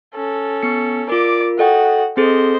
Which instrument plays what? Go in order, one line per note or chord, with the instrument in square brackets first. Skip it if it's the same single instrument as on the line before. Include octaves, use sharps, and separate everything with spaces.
[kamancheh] C#4 A4
[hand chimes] B3 C#7
[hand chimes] F4 A#4 [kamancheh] D5 D6
[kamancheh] F#4 F#5 [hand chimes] A4 D#5 G5
[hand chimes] C4 G#4 A4 [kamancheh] C5 D#5